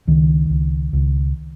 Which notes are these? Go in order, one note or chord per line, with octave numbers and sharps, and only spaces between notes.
C#2 D#3
C#2
C#2